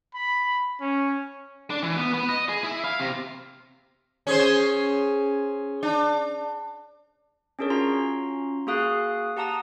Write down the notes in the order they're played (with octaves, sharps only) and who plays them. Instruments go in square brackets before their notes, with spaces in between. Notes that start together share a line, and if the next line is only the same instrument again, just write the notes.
[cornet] B5
C#4
[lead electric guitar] D4
E3
B3
B3
D#5
G#4
E4
F5
C3
[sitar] C#4 G#4 C5
D4
[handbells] C#4 D4 G#4 A#4 C#5
C#4 F4 F#4 A#5 C6
A#3 F#4 G#4 F5 D#6 F#6
G4 F#5 A5 A#5 D#6